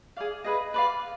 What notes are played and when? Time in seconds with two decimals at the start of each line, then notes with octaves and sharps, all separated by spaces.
0.16 G#4 D5 F5
0.44 G#4 B4 D#5
0.74 B4 D5 F5